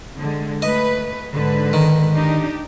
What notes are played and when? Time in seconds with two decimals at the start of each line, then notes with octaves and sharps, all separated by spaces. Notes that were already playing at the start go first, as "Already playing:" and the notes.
0.19 D3 G#3
0.62 A3 B4 D#5
1.32 G#2 D3 B4
1.73 D#3
2.15 D4 D#4 G4